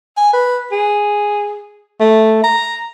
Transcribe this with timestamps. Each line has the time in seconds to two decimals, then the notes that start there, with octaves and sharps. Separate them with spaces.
0.17 G#5
0.33 B4
0.72 G#4
2.00 A3
2.43 A#5